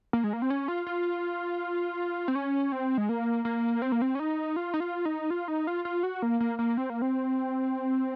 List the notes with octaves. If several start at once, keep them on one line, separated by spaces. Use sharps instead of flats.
A#3
G#3
A#3
C4
C#4
F4
F4
C4
C#4
C4
G#3
A#3
A#3
C4
A#3
C4
C#4
D#4
F4
D#4
F4
D#4
F4
D#4
F4
F4
F#4
A#3
A#3
A#3
C4
A#3
C4